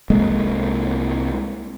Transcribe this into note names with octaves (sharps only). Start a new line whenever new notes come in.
C2 G#3 A#3